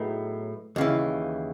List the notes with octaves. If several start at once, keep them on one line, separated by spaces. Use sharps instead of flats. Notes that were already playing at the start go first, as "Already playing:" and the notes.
Already playing: A2 F#3 B3 D#4 G#4
D#2 C#3 E3